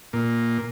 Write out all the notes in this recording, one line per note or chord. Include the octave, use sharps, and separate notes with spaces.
A#2